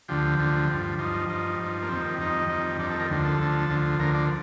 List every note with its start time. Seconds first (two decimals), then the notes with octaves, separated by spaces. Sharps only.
0.09 D2 D3 F3 G4
0.38 D2 D3 F3
0.69 G2 F3
0.99 G2 F3 D#4
1.14 D#4
1.29 G2 F3 D#4
1.59 G2 F3
1.82 A#3
1.88 F2 D#3 G3 C4
2.19 F2 D#3 G3 D#4
2.49 F2 D#3 G3
2.79 F2 D#3 G3 D4
2.90 A4
3.00 A#4
3.10 D2 D3 F3
3.25 A4
3.39 D2 D3 F3
3.70 D2 D3 F3
3.99 D2 D3 F3 A#4
4.14 D5